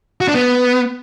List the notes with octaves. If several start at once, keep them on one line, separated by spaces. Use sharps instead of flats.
F#4
D4
B3